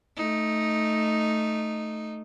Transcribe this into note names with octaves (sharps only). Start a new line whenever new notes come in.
A3 D#4